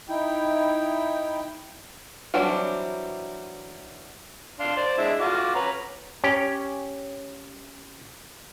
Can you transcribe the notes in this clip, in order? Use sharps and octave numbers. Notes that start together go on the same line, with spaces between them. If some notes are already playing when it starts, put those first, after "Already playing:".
D#4 E4 G5
E3 F#3 G3 C4 D4
D4 F5 C6
C5 D5
G#3 D4 E4
F4 F#4 D6
C#4 B4 A#5
C#4 G4